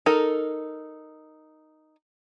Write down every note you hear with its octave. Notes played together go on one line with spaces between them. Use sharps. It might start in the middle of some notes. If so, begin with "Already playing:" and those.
D#4 A4 A#4